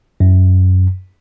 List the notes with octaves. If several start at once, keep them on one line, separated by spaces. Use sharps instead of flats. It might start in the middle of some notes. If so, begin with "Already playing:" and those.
F#2